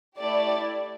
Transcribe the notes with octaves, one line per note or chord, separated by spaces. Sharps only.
A3 E4 G4 D5